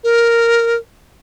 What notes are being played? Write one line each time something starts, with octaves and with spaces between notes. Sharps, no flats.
A#4